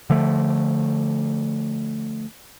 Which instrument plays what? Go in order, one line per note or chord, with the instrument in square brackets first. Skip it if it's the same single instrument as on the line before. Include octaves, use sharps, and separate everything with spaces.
[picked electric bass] D3 F3 A3